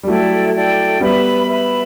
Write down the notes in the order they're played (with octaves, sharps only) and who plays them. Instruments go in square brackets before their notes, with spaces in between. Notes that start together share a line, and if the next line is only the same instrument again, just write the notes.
[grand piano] G3
[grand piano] F#3 A3 [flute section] E4 A4 D5 G5
[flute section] E4 A4 D5 G5
[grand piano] G3 B3 [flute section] B4 E5 B5
[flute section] B4 E5 B5